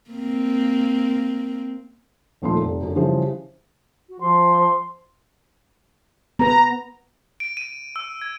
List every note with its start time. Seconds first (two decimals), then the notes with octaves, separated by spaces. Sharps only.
0.10 A#3 C4
2.42 D#1 A#2 F3 A3 D#4 C6
2.61 F1
2.82 F#2 D3
2.96 C#3 E3 F3 G3 G#4 C5
4.09 F#4
4.20 F3 C6
6.39 B3 B4 A#5
7.40 D7
7.57 D#7
7.96 E6
8.22 G#6